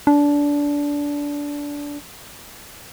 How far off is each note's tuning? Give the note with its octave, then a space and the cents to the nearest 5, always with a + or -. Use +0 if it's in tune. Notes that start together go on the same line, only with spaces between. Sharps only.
D4 -20